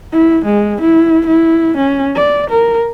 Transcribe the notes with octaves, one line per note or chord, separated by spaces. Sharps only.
E4
G#3
E4
E4
C#4
D5
A#4